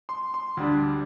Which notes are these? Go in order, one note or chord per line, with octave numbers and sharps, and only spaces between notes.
C6
C6
D2 D3 G3 D4